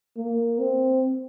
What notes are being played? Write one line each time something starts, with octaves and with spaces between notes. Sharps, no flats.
A#3
C4